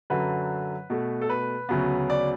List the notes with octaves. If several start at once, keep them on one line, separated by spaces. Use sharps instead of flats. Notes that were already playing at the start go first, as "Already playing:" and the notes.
F#2 D3 F#3 B4
B2 A3
A4
B4
D2 C#3 F#3 B3
D5